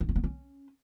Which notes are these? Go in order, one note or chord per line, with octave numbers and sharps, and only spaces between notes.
D4
C#4
B3
C#4